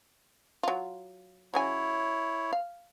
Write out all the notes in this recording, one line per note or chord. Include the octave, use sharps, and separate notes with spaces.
F#3 F4
C#3 F#3 E4 C#5 G#5
F5